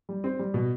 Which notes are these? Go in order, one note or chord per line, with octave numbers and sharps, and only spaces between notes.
G3
C4
G3
B2